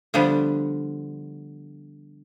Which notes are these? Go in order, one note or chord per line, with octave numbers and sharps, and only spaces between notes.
D3 F3 G3 B3 D4